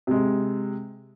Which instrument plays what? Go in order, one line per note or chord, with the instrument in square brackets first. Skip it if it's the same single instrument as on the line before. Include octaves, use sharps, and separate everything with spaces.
[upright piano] C3 G#3